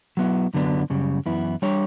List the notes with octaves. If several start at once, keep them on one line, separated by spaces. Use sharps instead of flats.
F#3 B3 E4
F#2 D3 F#3 B3 D4
F#2 C#3 G3
F#2 E3 B3 E4
G3 D4 G4 C#5